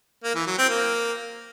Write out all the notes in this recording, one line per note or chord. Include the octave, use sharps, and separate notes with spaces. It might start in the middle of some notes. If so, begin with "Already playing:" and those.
A#3
E3
F#3
C4
A#3